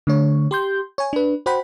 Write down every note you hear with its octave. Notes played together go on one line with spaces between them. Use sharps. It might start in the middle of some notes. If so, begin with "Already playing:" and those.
D3 A3 C#5
G4 C6 G6
C#5 G#5
D4 B4
F#4 C5 F#5 G5 B5